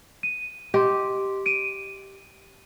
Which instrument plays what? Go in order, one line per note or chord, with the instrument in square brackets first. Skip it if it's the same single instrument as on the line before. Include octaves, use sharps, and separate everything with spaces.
[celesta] D#7
[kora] G4 [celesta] D#5 C6
[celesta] D7 D#7